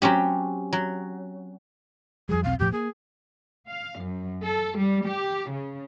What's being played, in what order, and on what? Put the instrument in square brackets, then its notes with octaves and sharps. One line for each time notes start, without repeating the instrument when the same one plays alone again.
[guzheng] F#3 C4 C#4 G4
F#3
[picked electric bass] F2 F3 G3 [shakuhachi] G#4
[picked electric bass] E1 B1 C4 [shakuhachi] F5
[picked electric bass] E1 A2 F3 [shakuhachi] G4
[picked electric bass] A#3 [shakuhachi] G#4
[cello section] F5
F#2
A4
G3
G4
C#3